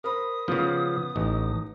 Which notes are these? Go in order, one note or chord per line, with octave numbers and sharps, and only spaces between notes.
A#4 C5 B5 D#6
C#3 F3 B3
A1 D#4